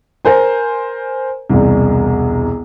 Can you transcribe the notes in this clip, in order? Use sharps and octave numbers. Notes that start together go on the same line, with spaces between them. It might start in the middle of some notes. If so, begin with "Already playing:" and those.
A#4 C5 G#5
E1 C2